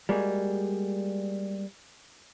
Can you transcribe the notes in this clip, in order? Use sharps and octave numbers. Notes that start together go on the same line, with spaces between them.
G3 G#3 A#3 F#4 G#4